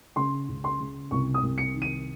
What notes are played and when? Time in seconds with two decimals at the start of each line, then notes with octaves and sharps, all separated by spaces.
0.16 C#3 C6
0.49 C#2
0.64 C6
0.80 C#3
1.11 C2 C#6
1.34 D#6
1.42 C2
1.58 C#7
1.74 D#3
1.82 D#7